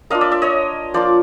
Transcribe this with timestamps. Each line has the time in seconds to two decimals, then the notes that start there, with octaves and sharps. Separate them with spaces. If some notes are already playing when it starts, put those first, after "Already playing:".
0.10 A#3 D4 F4 D#5 F5
0.21 D5 E5
0.32 D5 E5
0.42 C#5 D#5
0.94 F3 A#3 D4 F4 C5 D5